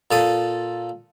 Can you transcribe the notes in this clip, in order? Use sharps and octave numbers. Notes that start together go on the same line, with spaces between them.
A#2 A4 D#6